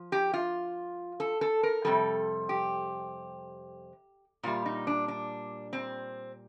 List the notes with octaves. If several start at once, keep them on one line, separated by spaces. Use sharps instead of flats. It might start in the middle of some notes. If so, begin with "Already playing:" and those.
Already playing: F3
G4
F4
A4
A4
A#4
F2 C3 G3 A4
G4
A#2 G3 F4
D#4
D4
D4
C4